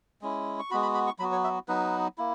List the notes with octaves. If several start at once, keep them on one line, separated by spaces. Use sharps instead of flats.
G#3 C#4 E4
C#6
G#3 B3 F#4 B5
B5
B5
C#6
F#3 B3 F#4 B5
C#5
E5
F#3 B3 D#4 B4
A#3 E4